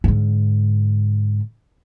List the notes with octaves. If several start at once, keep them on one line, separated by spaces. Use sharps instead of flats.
G#2 D3